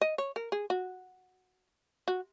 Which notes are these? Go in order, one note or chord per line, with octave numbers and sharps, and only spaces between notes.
D#5
C#5
A#4
G#4
F#4
F#4